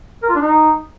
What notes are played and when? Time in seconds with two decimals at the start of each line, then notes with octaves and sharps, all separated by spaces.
0.23 A#4
0.29 F4
0.35 D4
0.41 D#4